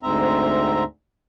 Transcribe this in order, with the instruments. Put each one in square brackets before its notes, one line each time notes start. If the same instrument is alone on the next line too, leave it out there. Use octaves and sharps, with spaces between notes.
[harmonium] D2 G#2 C4 E5 A#5